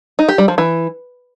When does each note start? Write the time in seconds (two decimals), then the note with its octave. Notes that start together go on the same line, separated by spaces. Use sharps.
0.19 D#4
0.29 G4
0.38 G3
0.48 F3
0.58 E3